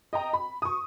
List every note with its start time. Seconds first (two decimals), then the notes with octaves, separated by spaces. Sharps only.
0.13 D#5 G5 A#5
0.33 B5
0.62 C#6 D#6